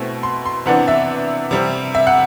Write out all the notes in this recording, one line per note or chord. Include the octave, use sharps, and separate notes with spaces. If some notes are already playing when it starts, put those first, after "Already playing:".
Already playing: B2 A3 C4 E4
C6
C6
C3 E3 B3 D4 F#5
E5
C3 G3 C4
E5
F#5